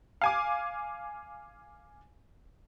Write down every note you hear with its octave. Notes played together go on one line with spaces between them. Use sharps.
F5 G#5 D6